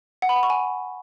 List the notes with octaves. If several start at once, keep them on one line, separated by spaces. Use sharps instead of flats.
F#5
B5
F#5
C#6
G#5